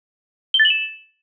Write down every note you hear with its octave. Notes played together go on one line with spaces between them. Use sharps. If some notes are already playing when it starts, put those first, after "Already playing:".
G7
A6
F#7
E7